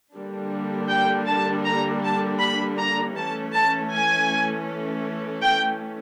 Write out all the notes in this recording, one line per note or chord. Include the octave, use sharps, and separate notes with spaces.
D3 G3 A#3 D4
G5
A5
A#5
A5
B5
A#5
E3 A3 C#4 A5
A5
G#5
G5